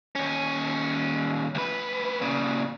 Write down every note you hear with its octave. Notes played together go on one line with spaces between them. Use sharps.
D#2 C#4
D2 B4
A#2 C#3